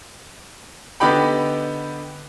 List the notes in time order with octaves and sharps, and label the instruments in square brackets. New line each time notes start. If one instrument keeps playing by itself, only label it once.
[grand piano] D3 B3 D#4 G4 G5 B5